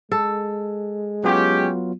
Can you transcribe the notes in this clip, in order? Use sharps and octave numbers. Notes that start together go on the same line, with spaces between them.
G#3 A4
F#3 B3 C#4 F4 G4